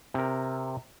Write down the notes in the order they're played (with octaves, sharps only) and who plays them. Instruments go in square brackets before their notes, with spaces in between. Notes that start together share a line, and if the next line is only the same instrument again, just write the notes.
[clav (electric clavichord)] C3 A#4